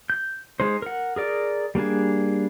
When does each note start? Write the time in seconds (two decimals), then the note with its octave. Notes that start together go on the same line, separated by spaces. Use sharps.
0.10 G6
0.60 G#3 D#4 C5
0.82 A#4 F#5
1.16 G#4 A#4 D5
1.75 G3 A#3 D4 G#4